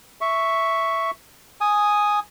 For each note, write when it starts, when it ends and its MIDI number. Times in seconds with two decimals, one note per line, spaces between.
0.21 1.11 76
0.21 1.11 85
1.61 2.19 80
1.61 2.19 87